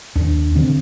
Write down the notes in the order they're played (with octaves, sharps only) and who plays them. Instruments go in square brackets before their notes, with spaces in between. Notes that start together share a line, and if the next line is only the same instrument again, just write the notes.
[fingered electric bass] D#2 D4
D3 C4